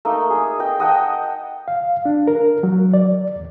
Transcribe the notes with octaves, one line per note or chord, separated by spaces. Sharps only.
A3 A#3 D#4
G#4
D#5 G5
D#5 F#5 G5 A5
F5
D4
A#4
F#3
D5
E2